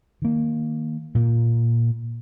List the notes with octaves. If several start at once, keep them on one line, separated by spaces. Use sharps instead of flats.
D#3 A#3
A#2 A#3